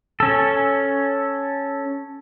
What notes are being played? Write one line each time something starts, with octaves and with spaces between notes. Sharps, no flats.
C#4 A4